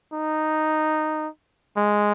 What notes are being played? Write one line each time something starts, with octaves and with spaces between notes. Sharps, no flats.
D#4
G#3